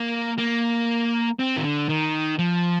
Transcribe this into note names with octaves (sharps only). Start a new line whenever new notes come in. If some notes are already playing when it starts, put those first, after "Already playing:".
Already playing: A#3
A#3
C4
D#3
D3
D#3
F3